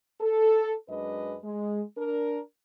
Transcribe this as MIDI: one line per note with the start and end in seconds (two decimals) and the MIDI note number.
0.21 0.73 69
0.89 1.36 42
0.89 1.36 56
0.89 1.36 62
0.89 1.36 71
0.89 1.36 75
1.43 1.82 56
1.97 2.40 62
1.97 2.40 70